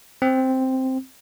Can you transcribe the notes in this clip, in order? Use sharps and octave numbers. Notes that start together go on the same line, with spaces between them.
C4